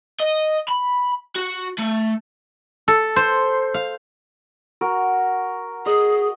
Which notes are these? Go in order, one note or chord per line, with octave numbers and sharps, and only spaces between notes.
D#5
B5
F#4
A3
A4
C5
F5
F#4 A#4
G#4 D#5